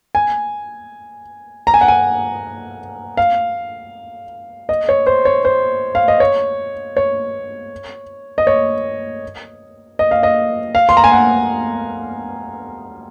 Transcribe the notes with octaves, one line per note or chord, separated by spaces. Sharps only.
G#5
A#5
G#5
F#5
G#5
F5
D#5
C#5
C5
C#5
C5
F5
D#5
C#5
C#5
D#5
C#5
D#5
F5
D#5
F5
C6
A#5
G#5
F#5